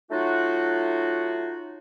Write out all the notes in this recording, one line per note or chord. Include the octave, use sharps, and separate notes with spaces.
F#3 A3 D#4 F4 F#4